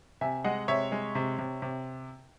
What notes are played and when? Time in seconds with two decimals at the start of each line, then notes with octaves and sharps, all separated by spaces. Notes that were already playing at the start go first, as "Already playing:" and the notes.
0.21 C3 E5 G#5
0.45 G#3 D#5 F#5
0.68 C3 C#5 E5
0.92 G#3
1.15 C3
1.39 C3
1.62 C3